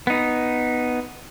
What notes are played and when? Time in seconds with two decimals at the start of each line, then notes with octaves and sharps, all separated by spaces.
0.07 B3 D#4